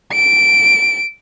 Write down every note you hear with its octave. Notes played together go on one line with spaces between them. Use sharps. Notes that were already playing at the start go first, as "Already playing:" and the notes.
D7